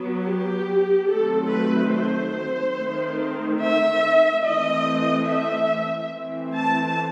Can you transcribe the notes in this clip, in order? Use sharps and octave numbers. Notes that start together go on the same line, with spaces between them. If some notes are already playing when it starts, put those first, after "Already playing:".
Already playing: F#3 B3
G4
D#3 F#3 A3 C4 A4
B4
C5
D#3 A3 C4
E5
E3 A3 C4 D#5
E5
E3 A3 C4
A5